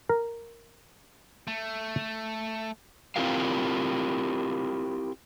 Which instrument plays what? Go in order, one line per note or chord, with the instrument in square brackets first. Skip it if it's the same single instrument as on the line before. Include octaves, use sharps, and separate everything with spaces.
[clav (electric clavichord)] A#4
[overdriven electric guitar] A3
[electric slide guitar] C4 E4 F4 G4 A#4 F5